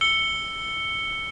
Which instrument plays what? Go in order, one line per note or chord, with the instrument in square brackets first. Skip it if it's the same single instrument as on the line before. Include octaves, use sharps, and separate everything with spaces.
[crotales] E6 C#7 G7